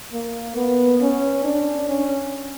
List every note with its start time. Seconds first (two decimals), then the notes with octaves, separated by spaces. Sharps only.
0.13 A#3
0.57 B3
1.01 C#4
1.45 D4
1.89 C#4